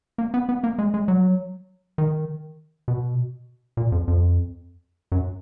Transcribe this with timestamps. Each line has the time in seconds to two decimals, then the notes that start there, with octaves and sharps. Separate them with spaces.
0.18 A#3
0.34 B3
0.49 B3
0.64 A#3
0.78 G#3
0.94 G#3
1.08 F#3
1.98 D#3
2.88 B2
3.77 A#2
3.92 F2
4.08 F2
5.12 F#2